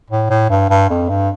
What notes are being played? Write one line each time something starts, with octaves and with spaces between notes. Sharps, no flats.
A2
A2
G2
G2
F2
G2